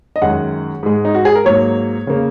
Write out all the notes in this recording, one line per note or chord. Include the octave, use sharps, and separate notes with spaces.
D#5
F#2 D#3 G#3 F#5
G#2 G#3
D#4
F#4
G#4
A#4
G#2 F#3 A#3 C#5
C#3 A#3